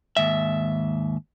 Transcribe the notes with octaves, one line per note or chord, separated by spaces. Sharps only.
D#2 G#2 E5